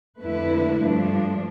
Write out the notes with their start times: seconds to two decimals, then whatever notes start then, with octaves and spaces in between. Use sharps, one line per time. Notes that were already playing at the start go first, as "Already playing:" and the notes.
0.19 F2 D3 A3 E4 B4
0.79 G2 F3 A3 D4